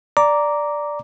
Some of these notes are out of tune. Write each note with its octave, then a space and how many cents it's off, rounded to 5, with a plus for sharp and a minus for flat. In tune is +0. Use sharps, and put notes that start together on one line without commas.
D5 +0 A#5 +0 D6 -10